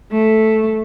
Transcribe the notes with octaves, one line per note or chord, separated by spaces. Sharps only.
A3